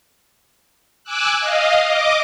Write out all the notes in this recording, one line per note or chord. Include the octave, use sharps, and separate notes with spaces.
G#5 D6 E6 F#6
D#5 F5
D#5 D6